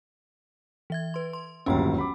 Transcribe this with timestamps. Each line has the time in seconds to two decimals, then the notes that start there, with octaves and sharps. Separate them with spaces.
0.90 E3 E5 G#6
1.14 B4 C6
1.33 C6
1.66 D1 G1 D#2 C#4 F#5 G5
1.98 B5 D6